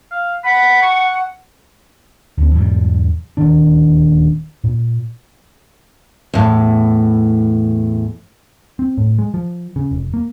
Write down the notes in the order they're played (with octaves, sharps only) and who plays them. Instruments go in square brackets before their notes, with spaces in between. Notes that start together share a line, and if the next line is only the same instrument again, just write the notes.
[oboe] F5
[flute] F#5 [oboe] B5
[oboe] C#6
[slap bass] D2 C4
E2 G#2 B2 G3
D#1 D2 D#3 D4
A#2
[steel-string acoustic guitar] E2 A2
[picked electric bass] C4
A2
G#3
F3
C#3
F1
A#3